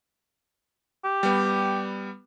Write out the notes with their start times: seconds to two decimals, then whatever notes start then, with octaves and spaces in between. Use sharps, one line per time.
1.05 G4
1.23 G3 B3